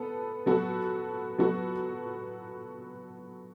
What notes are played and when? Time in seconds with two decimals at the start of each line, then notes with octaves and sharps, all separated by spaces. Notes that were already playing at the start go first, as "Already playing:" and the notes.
Already playing: B3 A4
0.46 F#3 B3 F#4 A4
1.38 F#3 B3 F#4 A4